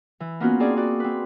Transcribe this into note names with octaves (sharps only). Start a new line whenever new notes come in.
E3
A#3 B3 C#4 F4 F#4
C4 D#4 G#4 D5
F#4 D5
C4 B4